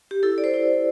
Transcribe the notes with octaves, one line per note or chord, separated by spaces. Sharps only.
G4
E4 A4
D5
C5
E4